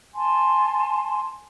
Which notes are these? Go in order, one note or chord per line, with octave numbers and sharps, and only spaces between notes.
G#5 A5 C6